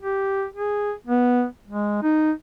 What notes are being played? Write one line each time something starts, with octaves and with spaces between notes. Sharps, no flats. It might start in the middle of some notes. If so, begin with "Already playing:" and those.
G4
G#4
B3
G#3
D#4